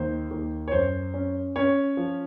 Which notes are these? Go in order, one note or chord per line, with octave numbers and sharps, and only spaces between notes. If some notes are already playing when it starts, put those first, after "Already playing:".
Already playing: D#2 C5
D#2
C#5
F#2 C5
C#4
C#4 C#5
F3